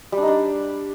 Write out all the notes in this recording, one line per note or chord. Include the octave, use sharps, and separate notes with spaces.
G3
D4
D#4
D4